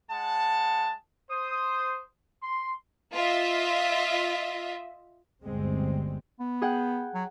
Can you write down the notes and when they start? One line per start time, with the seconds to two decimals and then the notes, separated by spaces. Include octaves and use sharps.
0.10 G#3 F#5 A5
1.30 C5 D#6
2.42 C6
3.13 F4 D#5 E5
5.45 G1 D2 G3 G#3 C4
6.40 B3
6.62 G#4 F#5 G5
7.15 F#3